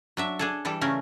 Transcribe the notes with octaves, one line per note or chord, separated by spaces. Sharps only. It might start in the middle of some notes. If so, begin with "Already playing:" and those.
F#3 D4 E5
D4 G#4 A4
E3 G3 A4
C#3 A3 C#4 A#4